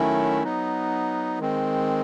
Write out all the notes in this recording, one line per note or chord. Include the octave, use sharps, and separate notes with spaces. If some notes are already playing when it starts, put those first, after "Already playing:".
Already playing: D#3 F#3 A3 C#4 E4
F#3 B3 D#4
D#3 G#3 C4